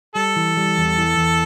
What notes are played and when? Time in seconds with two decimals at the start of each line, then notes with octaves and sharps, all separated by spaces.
0.15 G3 A4
0.36 E3
0.57 G3
0.78 E2
0.98 E3
1.17 E2